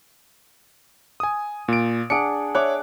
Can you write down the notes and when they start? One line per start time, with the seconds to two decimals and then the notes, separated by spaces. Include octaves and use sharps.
1.20 G#5 D#6
1.68 A#2 D7
2.10 D4 G#4 F#5 C#7 D7
2.55 C#5 D5 E5 D6 F#6